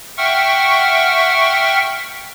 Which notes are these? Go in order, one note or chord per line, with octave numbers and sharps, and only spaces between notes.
E5 F#5 G5 C#6 F6